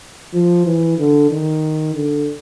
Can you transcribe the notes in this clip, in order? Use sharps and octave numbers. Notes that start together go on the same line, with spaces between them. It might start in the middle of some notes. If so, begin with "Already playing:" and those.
F3
E3
D3
D#3
D3